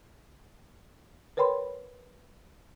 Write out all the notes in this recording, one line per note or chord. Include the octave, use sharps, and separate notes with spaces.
A#4 B4 C#5 G5 B5 C6